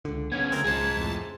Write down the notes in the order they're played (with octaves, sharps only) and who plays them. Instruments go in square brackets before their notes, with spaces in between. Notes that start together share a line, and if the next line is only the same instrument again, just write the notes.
[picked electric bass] C#2 D3
[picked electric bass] B1 C#3 [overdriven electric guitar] B3 C#4 [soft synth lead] G#6
[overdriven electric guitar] D2 [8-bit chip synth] C4 A#4
[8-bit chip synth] C#2 A5 [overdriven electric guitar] G#4 C5
[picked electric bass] F2 A2